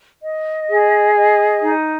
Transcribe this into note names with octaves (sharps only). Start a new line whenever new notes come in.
D#5
G#4
D#5
D#4